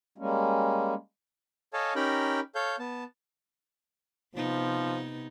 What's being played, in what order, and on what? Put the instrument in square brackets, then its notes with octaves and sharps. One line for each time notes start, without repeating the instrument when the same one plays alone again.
[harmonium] G3 G#3 A#3 C#4
[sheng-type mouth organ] A4 C#5 D#5 F5 G#5 A5
C#4 D#4 G4 A#4 G5 B5
A4 C#5 F5 G6
B3 A5
[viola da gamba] C3 B3 D#4 [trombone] F3